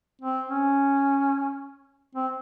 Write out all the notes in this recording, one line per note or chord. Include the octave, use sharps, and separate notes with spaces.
C4
C#4
C4